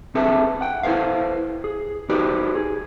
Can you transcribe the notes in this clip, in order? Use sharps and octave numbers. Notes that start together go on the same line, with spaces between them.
C4 D4 G#4 A4 B4 E5
F#5 G5
E4 A4 B4 C5 F5
G#4
D#4 F#4 G4 B4 C5 D5
G#4